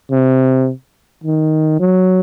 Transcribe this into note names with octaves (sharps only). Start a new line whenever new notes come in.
C3
D#3
F#3